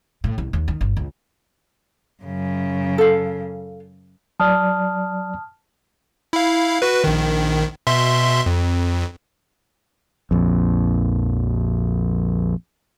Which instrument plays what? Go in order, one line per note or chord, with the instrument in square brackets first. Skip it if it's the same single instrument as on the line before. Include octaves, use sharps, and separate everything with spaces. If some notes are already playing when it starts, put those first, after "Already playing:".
[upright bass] A2
C2
D#2
D#3
G1
C#2
[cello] F#2 C#3
[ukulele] A4 F5
[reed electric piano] F#3 D5 [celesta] A5 D#6 F6
[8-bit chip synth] E4 F5
F#4 B4
A#1 D#3
B2 E5 C6
F2
[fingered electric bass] A#1 F2